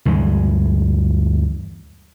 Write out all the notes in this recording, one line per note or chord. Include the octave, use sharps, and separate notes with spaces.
D2 G2 E3 G#3